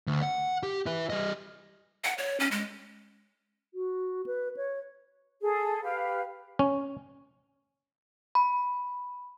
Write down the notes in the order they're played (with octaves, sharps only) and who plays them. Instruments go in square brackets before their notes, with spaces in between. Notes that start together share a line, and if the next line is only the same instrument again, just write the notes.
[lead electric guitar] D2
F#5
G4
E4 B4
G3 D#5
[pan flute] F#5
C#5
C#4
G#3
[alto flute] F#4
B4
C#5
[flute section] G#4 A4
G4 B4 F5
[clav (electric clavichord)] C#4
[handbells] B5